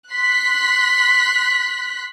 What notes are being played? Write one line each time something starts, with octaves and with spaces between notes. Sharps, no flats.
C6 F#6 B6